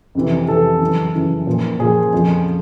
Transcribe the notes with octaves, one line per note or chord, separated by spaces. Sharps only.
F2 C3 E3
F2 C3 E3 A4
F#2 C#3 E3
F#2 C#3 E3
A#2 F3
A#2 F3 G#4
F2 C#3 F3